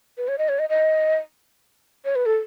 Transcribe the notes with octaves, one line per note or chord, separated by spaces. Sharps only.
B4
C#5
D#5
C#5
D#5
D#5
C#5
B4
A4